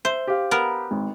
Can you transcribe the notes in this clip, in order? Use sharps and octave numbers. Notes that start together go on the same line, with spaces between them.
C5 E5
G4 F5
B3 A#4
G#1